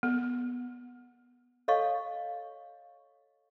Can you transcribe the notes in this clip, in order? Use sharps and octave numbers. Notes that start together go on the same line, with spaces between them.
B3
A4 C#5 D#5 F5 C#6